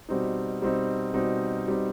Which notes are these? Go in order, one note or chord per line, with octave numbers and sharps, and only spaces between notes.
B2 G3 C4 D#4
B2 G3 C4 D#4
B2 G3 C4 D#4
B2 G3 C4 D#4